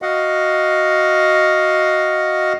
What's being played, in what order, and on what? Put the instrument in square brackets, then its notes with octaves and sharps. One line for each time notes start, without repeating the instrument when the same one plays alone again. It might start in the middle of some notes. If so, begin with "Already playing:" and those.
[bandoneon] F#4 D#5 F5 F#5